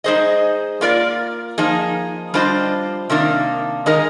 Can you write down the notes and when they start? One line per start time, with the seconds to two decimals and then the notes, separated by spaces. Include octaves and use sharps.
0.04 G#3 D#4 G#4 C5 D#5
0.81 A#3 F4 A#4 D5
1.58 F3 A#3 D#4 G#4
2.34 G3 D4 F4 C5 D#5
3.10 C3 D#3 A#3 D4
3.86 D#3 G#3 D#4 A#4 D#5